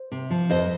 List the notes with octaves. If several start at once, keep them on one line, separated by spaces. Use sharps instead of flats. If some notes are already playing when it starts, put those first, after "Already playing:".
Already playing: C5
C3
F3
F2 C5 D#5